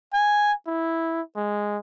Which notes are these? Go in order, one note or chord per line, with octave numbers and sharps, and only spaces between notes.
G#5
E4
G#3